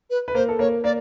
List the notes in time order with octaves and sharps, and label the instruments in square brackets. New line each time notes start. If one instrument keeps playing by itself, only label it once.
[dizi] B4
[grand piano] B4
[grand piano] A#3 A#4 [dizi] C5
[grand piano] A4
[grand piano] A#3 A#4 [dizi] C#5
[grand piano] A#3 A#4 [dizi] D5